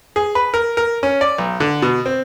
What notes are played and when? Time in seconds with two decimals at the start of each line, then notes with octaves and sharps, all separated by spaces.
0.16 G#4
0.35 B4
0.54 A#4
0.77 A#4
1.03 C#4
1.21 D5
1.38 B1
1.60 D3
1.82 B2
2.06 C4